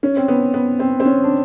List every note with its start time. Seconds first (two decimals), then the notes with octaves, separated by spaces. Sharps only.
0.03 C#4
0.17 C4
0.28 B3
0.54 B3
0.79 C4
1.00 C4
1.05 C#4
1.24 D4